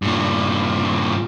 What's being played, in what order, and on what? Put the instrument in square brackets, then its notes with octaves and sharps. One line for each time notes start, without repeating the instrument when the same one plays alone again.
[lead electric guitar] G2 A#2